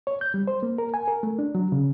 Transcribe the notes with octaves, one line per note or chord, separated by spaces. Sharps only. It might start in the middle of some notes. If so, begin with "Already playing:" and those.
C#5
G6
G3
C5
A#3
A#4
G#5
A#4
A3
D4
F#3
C#3